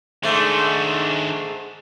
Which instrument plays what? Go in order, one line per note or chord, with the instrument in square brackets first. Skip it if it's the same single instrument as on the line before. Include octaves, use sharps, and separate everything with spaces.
[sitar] G#2 A3 [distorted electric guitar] D#3 D4